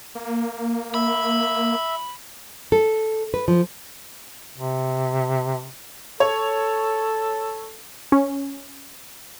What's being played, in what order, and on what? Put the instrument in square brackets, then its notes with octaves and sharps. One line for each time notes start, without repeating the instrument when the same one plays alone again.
[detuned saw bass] A#3
[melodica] E5 [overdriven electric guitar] B5
[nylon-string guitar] A4
B4
F3
[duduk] C3
[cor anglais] A4 [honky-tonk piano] C#5
[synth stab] C#4